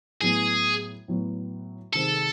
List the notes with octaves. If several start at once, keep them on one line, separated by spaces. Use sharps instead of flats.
A2 F#3 B3 G#4
A2 F#3 B3
C3 D#3 G#3 C4 A4